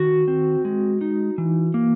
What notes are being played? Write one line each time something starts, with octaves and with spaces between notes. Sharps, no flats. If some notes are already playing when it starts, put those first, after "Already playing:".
Already playing: D#3 F#4
C4
G#3
D#4
E3
A#3